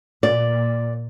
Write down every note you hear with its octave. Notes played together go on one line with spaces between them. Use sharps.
A#2 D5